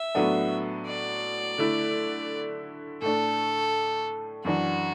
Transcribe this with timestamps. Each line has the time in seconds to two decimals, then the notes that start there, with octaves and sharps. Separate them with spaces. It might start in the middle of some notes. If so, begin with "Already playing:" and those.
Already playing: E5
0.15 A2 F#3 B3 D4
0.87 D5
1.58 D3 A3 E4
3.02 A2 A3 D4 A4
4.45 F#2 E3 D4 F#4